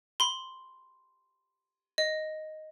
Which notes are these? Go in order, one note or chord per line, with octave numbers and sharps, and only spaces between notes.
B5 C6
D#5